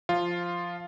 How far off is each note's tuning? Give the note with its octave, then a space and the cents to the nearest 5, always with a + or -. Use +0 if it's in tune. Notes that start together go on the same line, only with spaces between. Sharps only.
F3 +0 F4 +0